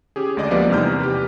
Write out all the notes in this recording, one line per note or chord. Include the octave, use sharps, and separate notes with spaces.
C#4 G4 G#4
D2 G#3 D5 D#5 D6
F3 G3 A#3 B3 B4 D5
E2 C3 D#4 F6 G6
G4 B4